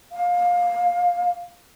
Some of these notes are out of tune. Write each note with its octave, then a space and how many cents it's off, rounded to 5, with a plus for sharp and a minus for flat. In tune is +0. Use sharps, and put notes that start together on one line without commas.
F5 +20